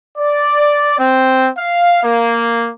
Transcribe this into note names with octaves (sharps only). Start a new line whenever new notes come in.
D5
C4
F5
A#3